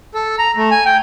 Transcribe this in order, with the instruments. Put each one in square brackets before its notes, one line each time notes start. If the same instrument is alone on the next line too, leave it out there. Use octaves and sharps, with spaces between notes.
[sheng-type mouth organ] A4
A#5
A3
G#5
G5